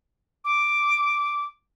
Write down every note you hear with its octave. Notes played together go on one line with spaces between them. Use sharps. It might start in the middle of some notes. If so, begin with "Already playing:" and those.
D6